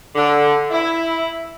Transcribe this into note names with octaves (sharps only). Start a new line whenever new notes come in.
D3
E4